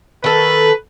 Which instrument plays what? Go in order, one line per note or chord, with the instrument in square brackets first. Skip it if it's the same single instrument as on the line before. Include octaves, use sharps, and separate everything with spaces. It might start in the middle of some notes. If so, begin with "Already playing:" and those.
[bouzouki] D#3 A4 [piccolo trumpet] B4